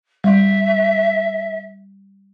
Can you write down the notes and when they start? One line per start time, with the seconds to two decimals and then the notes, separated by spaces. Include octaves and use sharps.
0.24 G3 E5